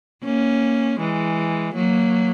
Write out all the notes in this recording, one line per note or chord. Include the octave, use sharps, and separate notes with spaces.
A#3 C#4
E3 G#3
F#3 A#3